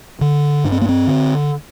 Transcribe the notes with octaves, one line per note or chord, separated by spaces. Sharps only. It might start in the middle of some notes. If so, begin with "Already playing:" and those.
D3
G2 D4
C4
A#3
C4
D3